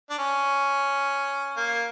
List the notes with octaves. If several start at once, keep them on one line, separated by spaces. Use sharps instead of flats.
D4
C#4
A#3